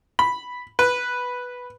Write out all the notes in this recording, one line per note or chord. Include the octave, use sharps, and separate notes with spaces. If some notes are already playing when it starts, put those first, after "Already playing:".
B5
B4